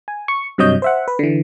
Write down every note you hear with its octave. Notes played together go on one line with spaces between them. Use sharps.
G#5
C#6
G2 C3 F#3 C#5 D#5 G6
C5 E5 F#5
B4
D3 E3